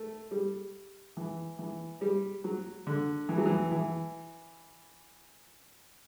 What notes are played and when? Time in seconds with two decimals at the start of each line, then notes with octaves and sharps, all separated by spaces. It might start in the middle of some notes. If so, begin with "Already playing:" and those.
Already playing: A3
0.31 G3
1.17 E3
1.59 E3
2.01 G3
2.44 F#3
2.87 D3
3.29 E3
3.38 F#3
3.46 E3
3.72 E3